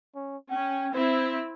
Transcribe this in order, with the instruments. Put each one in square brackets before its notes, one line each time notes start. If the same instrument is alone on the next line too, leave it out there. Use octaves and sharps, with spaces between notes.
[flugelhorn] C#4
[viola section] C#4 [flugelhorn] G5
[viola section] C4 E4 [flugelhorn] C5